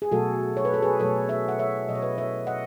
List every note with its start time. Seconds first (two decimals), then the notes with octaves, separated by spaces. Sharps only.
0.02 G#4
0.12 B2 F#3 A3 F#4 A4
0.57 C#5
0.65 B4
0.74 A4
0.82 G#4 B4
1.00 B2 F#3 A3 A4 C#5
1.29 C#5 E5
1.48 F#5
1.59 C#5 E5
1.88 B2 F#3 A3 D#5
1.95 C#5
2.02 B4 D#5
2.18 C#5 E5
2.47 D#5 F#5